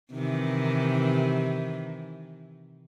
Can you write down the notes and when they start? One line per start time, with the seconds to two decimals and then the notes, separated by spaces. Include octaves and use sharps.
0.12 C3 D#3 E3